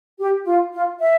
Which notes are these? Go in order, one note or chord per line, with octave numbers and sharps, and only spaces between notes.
G4
F4
F4
E5